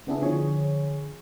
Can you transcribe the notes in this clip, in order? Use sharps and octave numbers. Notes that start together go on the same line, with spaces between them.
C#3 B3 D4 E4 G#4
D3 F3 G#4 C#5